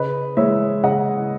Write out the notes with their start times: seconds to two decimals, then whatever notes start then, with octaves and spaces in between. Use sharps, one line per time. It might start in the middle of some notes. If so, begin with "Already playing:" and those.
Already playing: C#3 B4 D#5
0.37 E3 G#3 C#5 E5
0.83 C#3 D#5 F#5